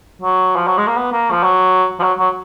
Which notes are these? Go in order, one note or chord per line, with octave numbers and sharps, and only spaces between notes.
F#3
F3
F#3
G#3
A#3
B3
A#3
F3
F#3
F3
F#3
F#3